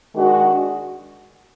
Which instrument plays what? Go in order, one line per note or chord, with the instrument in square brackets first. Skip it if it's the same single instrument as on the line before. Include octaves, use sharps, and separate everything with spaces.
[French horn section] D#3 G#3 D4 F#4